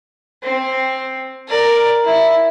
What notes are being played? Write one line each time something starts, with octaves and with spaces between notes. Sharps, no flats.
C4
A#4 D5
E4